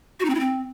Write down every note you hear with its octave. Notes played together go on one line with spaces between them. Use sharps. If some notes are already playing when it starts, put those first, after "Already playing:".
F#4
D#4
C4
E4
C4